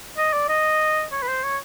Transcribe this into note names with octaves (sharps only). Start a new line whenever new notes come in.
D#5
D5
D#5
C#5
B4
C5
C#5